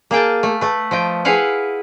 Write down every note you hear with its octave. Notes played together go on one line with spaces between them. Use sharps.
A#3 G#4 G5 A5
A3
A3 B4
F3 D#5 G5
E4 G#4 B4 F5 F#5 G#5